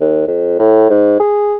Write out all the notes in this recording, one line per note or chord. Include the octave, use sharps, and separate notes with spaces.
D#2
F2
A2
G#2
G#4